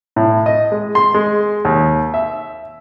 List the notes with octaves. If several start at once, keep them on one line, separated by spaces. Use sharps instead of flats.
A2
D#5
G#3
C6
G#3
D#2
E5